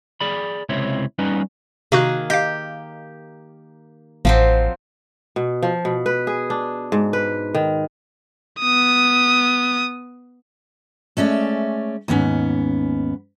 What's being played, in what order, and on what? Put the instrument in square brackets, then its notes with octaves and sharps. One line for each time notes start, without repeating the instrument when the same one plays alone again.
[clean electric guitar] G#4 D5 B5
C#2 C3 C4 E4 C#5
G3 B3 C#4 D#4 B4
[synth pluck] C3 F#4 F#6 [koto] D#3 A#3 G#4
[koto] G4 [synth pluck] D#5 F5
[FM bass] A1 [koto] F3 F#3 C4
[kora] B2
F3
B2
B4
G#4
D4
G#2
B4
D#3
[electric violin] B3 D#6
[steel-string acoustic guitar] G#3 A3 C#4 D5 E5
D#2 G#2 B3 C#4